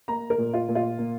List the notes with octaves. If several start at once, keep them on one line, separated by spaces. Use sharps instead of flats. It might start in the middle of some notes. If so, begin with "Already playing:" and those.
A#3 A#5
A#4
A#2
F4
A#2
F4
A#3